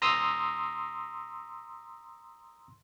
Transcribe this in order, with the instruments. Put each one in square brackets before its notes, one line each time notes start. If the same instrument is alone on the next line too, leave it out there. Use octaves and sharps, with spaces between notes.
[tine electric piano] A#5 C6 D#6 E6